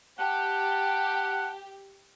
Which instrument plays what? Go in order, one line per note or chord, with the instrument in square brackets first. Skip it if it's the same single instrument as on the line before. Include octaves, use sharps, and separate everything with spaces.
[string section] G4 [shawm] F#5 [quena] A5